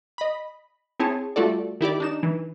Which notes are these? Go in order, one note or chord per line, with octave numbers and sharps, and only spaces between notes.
D#5 B5
C4 E4 G#4 C#5 A5
G3 A3 F4 F#4 A4 D5
D#3 E4 G4 D5
D4 D#4 E7
E3